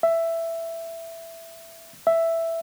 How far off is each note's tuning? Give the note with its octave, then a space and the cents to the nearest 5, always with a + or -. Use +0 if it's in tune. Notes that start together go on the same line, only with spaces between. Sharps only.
E5 +10
E5 +5